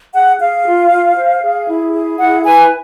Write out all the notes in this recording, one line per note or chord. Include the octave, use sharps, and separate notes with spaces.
G#4 F#5
G#4 F5
F4
F4
C5
G#4
E4
G#4
E4 F#5
B4 G#5